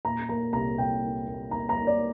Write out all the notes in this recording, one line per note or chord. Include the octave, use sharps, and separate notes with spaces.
A#2 A#5
A#3 A#5
C2 A#5
C2 G5
A#3
A#3
A#3 A#5
A#5
A#3
D5